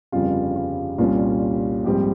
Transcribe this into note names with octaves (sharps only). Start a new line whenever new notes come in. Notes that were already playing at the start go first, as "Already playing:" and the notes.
G1 F2 C#3 G3 F4
F4
C2 A#2 G3 C#4 F4
A#1 G#2 G3 C4 G4